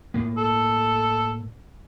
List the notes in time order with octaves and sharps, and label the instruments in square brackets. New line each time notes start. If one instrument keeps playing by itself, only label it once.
[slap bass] A2 A#3
[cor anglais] A4